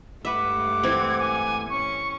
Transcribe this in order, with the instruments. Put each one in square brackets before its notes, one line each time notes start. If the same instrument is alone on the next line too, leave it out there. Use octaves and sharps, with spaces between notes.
[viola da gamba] G2 G#3 A3 [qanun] B4 E5 [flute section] F#5 D6
[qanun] E3 C4 [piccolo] G#6
[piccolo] G#5
[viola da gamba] C#4 [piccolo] C#6